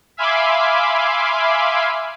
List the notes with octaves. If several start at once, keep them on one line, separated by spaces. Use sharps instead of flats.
E5 F5 G#5 B5 C6 D6